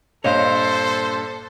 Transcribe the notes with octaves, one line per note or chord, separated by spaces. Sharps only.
G2 A#2 A4 C5 C#5 D#5 F5